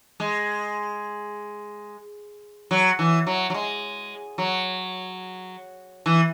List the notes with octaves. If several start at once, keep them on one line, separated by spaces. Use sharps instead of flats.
G#3
F#3
E3
F#3
F#3
G#3
F#3
E3